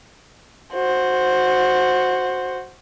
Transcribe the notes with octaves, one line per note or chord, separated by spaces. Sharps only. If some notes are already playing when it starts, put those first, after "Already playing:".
F#4 C5